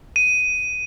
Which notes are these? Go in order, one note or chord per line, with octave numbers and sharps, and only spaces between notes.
D#7